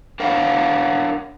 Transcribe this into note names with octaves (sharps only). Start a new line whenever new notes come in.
D4 A#4 C#5 F5 F#5